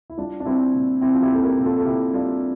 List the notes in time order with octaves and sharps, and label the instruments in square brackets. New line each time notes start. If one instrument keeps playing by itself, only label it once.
[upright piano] E4
G3 D4 F4
D4
G3 C4 E4
A#2
G3 C4 E4
F4
E4 G4
A#2 A4
G4 A#4
A#2
F4 A4
A4
A#2 E4 G4
G3 D4 F4